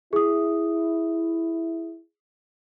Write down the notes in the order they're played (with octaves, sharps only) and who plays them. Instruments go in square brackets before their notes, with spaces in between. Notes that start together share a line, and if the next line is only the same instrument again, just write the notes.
[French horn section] E4 [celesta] G#4 D#6